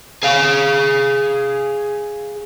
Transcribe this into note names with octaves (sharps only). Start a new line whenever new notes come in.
G#4 F5